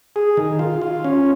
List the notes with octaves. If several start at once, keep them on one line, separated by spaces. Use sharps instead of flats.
G#4
D#3
F4
F4
C#4